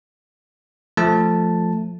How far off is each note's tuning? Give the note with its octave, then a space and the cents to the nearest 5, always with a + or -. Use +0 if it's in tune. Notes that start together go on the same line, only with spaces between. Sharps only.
F3 +0 A3 +0 A5 +0